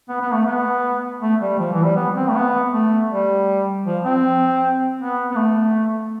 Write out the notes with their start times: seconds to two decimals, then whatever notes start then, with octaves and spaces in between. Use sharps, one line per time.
0.09 B3
0.21 B3
0.33 A3
0.46 B3
1.22 A3
1.41 G3
1.59 F3
1.72 E3
1.84 G3
1.96 B3
2.16 C4
2.28 A3
2.35 B3
2.73 A3
3.10 G3
3.86 F3
4.04 C4
4.99 B3
5.31 B3
5.36 A3